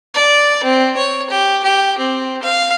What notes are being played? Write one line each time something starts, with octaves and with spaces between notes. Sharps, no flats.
D5
C4
C#5
G4
G4
C4
F5